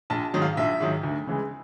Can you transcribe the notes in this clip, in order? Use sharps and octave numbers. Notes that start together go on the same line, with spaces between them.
A#1 A5
G#2 D#3 F#3
F5
A#1 E5
G#2 D#3 F#3
D2
C#3 E3 G#3